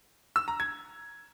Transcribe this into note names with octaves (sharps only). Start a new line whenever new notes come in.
E6
A#5
G#6